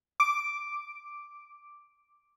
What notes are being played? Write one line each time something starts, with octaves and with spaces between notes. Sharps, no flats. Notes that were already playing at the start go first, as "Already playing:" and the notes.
D6 D7